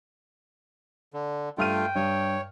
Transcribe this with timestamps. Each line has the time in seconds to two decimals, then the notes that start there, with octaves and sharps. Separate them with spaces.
1.14 D3
1.58 G2 A3 F4 G5 F6 D#7
1.95 G2 C#5